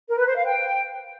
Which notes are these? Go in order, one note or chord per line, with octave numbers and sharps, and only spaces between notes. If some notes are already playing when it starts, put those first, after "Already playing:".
A#4
B4
C5
F5
G5